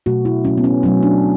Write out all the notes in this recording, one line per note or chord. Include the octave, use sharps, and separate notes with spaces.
B2 F#3 A3 F#4
E4
B2 F#3 A3 C#4
B3
C#4
B2 F#3 A3 C#4
D4
B2